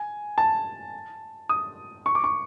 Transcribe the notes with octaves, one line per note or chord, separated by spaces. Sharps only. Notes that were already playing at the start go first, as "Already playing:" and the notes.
Already playing: G#5
A5
D#6
C#6
D6
C#6